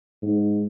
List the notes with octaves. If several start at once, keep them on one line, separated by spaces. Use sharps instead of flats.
G#2